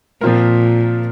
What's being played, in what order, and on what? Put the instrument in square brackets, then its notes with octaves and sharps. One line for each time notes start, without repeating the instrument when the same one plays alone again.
[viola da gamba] A#2 [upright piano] F3 C4 F4 A#4